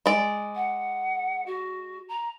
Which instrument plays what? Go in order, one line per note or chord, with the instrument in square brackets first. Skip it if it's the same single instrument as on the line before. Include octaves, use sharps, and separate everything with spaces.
[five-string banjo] G#3 D5
[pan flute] F#5
F#4
A#5